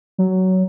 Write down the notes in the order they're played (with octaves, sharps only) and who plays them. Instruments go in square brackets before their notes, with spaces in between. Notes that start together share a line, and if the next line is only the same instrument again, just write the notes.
[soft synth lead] F#3